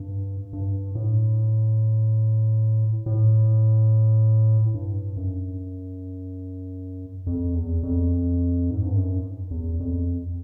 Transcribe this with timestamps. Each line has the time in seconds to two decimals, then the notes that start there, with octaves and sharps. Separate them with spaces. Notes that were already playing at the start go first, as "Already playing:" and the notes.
Already playing: G2
0.53 G2
0.95 A2
3.06 A2
4.74 G2
5.16 F#2
7.27 F2
7.55 E2
7.83 F2
8.70 G#2
8.83 G2
8.95 F#2
9.51 E2
9.80 F2